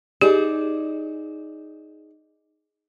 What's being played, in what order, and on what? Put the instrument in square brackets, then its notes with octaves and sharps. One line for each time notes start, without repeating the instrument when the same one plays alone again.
[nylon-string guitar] D#4 G#4 D5 [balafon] G4